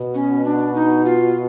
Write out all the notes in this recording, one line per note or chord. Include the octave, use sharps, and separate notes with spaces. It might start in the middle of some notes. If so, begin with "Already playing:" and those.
Already playing: B2
C#4
D4
D#4
F4